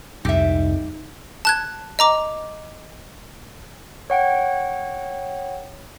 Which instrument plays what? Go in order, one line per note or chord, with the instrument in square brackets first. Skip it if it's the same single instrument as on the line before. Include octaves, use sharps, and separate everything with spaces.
[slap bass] C2 G#2 [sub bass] F2 [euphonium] D#4 [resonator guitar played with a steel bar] G4 E5
[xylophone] A5 F#6 G#6
D#5 A#5 D6
[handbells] C#5 F#5 G5